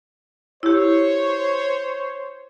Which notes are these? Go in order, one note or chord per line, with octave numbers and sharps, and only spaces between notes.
E4 G4 C5 C#5